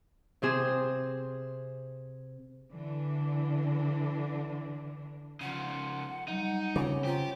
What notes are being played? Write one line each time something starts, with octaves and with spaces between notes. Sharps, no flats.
C3 C4 G#4 E7
D3 E3 D4
C#3 F3 F#5
F#3 G3 D#4
C#3 C4 F4 F#5 D6
F4 G4 C5 A#5